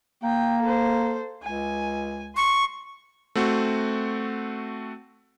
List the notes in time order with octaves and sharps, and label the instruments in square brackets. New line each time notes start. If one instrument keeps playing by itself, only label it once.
[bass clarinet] A#3 [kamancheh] G5
[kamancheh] A4 C5
[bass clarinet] C#2 [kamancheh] G#5
[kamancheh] C6 [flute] C#6
[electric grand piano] A3 C4 F#4